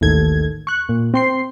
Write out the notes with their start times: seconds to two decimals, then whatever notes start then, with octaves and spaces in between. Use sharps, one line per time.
0.01 A1 D#2 D#3 A4 G#6
0.67 C#6 F#6
0.89 A#2
1.14 C4 C6 C7